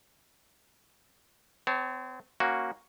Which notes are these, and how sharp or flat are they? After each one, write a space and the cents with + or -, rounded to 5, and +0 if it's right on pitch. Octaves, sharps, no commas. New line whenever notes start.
C4 -35 C#5 +0 A5 +0
A#3 +0 C#4 -5 F#4 +0